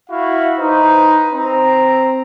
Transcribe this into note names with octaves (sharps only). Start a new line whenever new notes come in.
E4 F#4 F5
D#4 B4 C5
C4 A#5